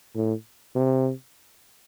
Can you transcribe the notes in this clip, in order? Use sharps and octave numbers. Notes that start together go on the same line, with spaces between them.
A2
C3